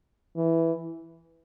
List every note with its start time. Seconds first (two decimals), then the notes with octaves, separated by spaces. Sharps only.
0.36 E3